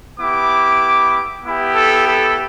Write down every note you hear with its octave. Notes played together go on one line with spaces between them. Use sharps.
B3 E4 G4 D6
B3 E4 G4
A4
A4